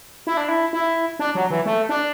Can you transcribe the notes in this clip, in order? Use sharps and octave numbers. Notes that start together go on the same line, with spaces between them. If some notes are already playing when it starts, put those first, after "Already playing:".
E4
D4
E4
E4
D4
F#3
E3
A3
D4